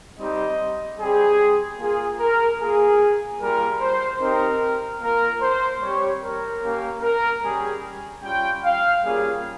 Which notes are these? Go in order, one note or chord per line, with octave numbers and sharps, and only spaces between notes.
G3 C4 D#4 G4 D#5
G3 C4 G4 G#4
A#3 F4 G#4
A#4
A#3 F4 G#4
G3 A#3 F4 A#4
C5
C4 D#4 G4 A#4
A#3 F4 A#4
C5
G3 C4 G4 C#5
A#4
A#3 C#4 G4
A#4
G3 C#4 G4 G#4
G3 C#4 F4 G5
F5
G3 A#3 C#4 F4 G#4